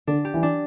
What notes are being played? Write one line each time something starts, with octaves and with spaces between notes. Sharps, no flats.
D3 D4
G4
E3
D4